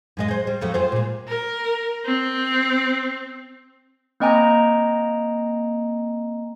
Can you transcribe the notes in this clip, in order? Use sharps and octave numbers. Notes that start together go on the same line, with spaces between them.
F#2 G#3 D#5
G#4 C5
G3
F2 F#3 A3
F4 G#4 C5
A#2 G#3
A#4
C4
A#3 C4 D#5 G5 G#5 A#5